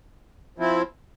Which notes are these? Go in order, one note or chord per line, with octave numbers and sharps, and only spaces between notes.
F3 C4 E4